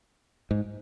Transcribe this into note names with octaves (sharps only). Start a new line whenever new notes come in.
G#2